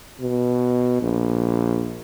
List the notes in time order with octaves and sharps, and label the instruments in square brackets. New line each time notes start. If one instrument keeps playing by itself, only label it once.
[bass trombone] B2
A#1